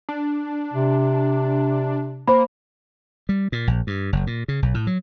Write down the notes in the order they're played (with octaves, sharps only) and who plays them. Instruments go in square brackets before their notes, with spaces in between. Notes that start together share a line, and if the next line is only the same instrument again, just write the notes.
[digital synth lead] D4
[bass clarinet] C3
[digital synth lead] A#3 [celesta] C5 B5
[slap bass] G3
A#2
A#1
G2
F#1
A#2
C#3
B1
A2
F#3